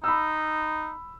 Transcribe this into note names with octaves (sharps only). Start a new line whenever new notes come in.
D#4 B5 E6